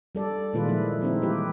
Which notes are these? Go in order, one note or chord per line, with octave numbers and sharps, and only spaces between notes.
G3 A4 D5
A#2 D#3 G#3 F4 B4 D5
F3 A#3 E4
G3 G#3 C4 D#4 E4
E3 G4 B4